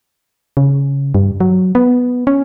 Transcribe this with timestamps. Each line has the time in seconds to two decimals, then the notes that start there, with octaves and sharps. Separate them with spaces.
0.57 C#3
1.15 G2
1.40 F#3
1.75 B3
2.27 C#4